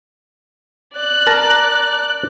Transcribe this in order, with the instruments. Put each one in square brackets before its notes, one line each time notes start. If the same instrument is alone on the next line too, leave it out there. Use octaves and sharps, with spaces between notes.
[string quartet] D5 F#6
[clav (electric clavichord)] A#4 A5 A#5